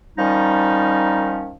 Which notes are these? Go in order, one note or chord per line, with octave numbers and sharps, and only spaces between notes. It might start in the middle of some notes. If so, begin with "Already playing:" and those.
D#3 F3 G3 C#4 D#4